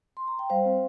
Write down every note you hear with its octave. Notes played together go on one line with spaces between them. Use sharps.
C6
A#5
G5
G3 C5 F5
C4